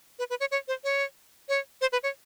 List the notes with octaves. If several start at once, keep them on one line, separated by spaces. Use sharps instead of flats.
B4
B4
C#5
C#5
C5
C#5
C#5
C5
B4
C#5